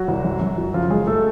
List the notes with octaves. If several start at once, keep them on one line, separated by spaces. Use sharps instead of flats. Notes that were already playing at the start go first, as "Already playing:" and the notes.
Already playing: F#3 F#4
C2
F#2
F#2
F#3
C#3 F3 F4
F#2 G#3 G#4
A3 A4